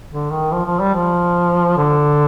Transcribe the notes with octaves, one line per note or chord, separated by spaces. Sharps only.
D3
D#3
F3
F3
G3
F3
D3